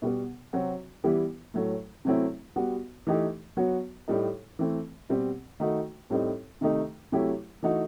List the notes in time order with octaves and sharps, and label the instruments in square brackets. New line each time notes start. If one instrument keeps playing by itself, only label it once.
[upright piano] B2 G3 B3
C3 F#3 C4 F#4
E3 G3 B3 E4 G4
A2 F#3 A3
C3 F#3 A3 C4 E4
G3 B3 F#4
E3 A3 D#4 G4
F#3 B3 F#4
A2 G3 D#4
E3 A3 C4
B2 G3 C4
D#3 A3 D#4 F#4
A2 G3 C4 D#4
C3 D#3 A3 D#4 G4
C3 F#3 A3 E4 G4
E3 A3 D#4 F#4